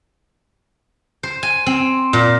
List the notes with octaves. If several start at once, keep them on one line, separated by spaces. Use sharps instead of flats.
C5
G#5
C4
A#2